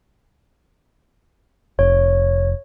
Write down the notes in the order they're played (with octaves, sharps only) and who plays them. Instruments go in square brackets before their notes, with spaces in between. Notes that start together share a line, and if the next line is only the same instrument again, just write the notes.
[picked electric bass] F1 [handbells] C#5